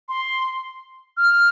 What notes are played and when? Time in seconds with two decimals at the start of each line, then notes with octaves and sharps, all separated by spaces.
0.09 C6
1.17 F6